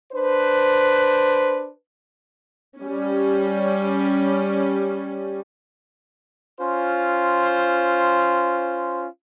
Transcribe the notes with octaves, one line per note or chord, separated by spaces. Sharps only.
D4 B4 C5
G3 C#4
C#4 F4 C5